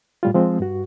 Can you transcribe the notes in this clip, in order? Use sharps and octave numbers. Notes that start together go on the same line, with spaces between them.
A2 G3 F4
F3 G#3 C4
G2 F#4